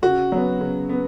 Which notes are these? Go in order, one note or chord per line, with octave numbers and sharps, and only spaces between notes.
C#3 F#4
F#3 B3
C#3
B3